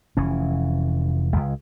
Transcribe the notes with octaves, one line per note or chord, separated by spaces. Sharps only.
F1 E3 C#4
C#2 G#3